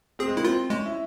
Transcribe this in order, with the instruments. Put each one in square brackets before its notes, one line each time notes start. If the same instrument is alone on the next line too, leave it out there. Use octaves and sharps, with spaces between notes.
[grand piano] C4 [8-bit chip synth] G#4
[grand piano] G#3
[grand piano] A#3 [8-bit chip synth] E4
[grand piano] C4 [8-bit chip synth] F4
[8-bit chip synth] G#3 [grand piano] C#4
[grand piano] E4